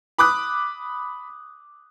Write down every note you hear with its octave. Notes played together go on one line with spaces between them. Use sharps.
B5 D6 D#6 F#6